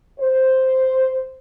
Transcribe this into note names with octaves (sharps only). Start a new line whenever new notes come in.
C5